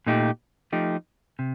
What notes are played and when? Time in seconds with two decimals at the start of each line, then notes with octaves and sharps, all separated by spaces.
0.07 A#2 A3 D#4 G4
0.72 F3 A3 D#4 G4
1.39 C3